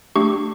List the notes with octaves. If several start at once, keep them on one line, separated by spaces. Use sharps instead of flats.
A3 D4 G4 C#6